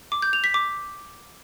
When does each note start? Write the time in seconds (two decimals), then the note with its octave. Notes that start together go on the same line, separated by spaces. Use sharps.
0.12 D6
0.22 G6
0.33 F7
0.44 B6
0.54 D6